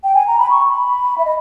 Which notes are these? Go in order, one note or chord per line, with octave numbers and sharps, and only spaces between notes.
G5
G#5
A#5
B5
C#6
B5
E5
D#5